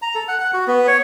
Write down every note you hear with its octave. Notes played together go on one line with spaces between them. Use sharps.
A#5
A4
F#5
F#5
F#4
B3
C#5